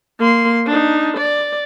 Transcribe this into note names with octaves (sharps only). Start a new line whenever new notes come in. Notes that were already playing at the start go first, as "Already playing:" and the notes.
A#3 C6
D4 D#4
D5